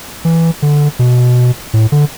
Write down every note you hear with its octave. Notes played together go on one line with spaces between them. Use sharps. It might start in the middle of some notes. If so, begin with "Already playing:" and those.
E3
D3
B2
A2
D3